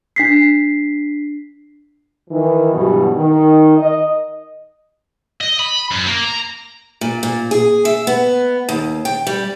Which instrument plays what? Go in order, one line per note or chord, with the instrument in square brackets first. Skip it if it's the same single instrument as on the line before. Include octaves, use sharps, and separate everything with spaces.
[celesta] D4 B6 C7
[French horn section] D#3 E3
G2 B2 E3 F#3
D#3
D#5
[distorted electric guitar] D#5
B5
F#2
A#3
A#5
[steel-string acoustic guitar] A#2
A#2
G#4
E5
B3
D#2
G5
G3